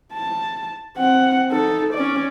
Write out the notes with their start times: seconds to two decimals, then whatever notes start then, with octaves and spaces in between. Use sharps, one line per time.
0.14 A5
0.97 C4 F#5
1.51 D#4 A4
1.94 C#4 D5